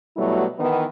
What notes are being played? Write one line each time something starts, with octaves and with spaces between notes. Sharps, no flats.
B2 F#3 G3 A3 E4
D#3 E3 B3